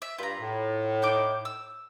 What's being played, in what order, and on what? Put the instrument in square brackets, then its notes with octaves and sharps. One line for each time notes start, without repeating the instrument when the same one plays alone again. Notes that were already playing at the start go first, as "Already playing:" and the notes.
[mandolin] E5
[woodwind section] G2 B5 [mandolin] F4 A#5
[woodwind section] A2
[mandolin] D#4 G5 D6
E6